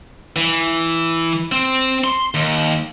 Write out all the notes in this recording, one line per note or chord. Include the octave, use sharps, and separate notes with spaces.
E3
C4
C6
D#2